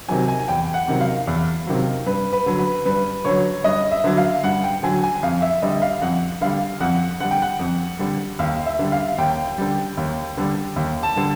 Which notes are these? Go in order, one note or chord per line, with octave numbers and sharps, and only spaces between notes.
C3 D#3 F#3 G#5
G#5
E2 G5
F#5
C3 D#3 F#3
F5
E2
C3 D#3 F#3
G2 B4
B4
D3 F#3
B4
G2 B4
D3 F#3 C#5
G2 D#5
E5
D3 F#3
F5
G2 F#5
G5
D3 F#3 G#5
G#5
F2 F5
E5
D3 G3 D#5
F5
F2 F#5
D3 G3 F5
F2 F#5
D3 G3 F#5
G5
F#5
F2
D3 G3
D#2 F5
E5
D3 G3
F5
D#2 G5
D3 G3
D#2
D3 G3
D#2
A5
D3 G3